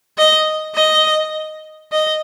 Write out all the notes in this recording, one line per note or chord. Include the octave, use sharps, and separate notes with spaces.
D#5
D#5
D#5